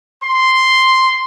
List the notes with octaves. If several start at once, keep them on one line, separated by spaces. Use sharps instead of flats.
C6